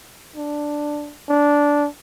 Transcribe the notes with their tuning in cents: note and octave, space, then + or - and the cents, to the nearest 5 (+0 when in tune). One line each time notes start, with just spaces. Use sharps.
D4 +5
D4 -10